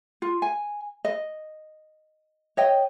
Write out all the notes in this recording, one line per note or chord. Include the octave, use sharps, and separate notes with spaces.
F4
G#5
D#5
C#5 D#5 G5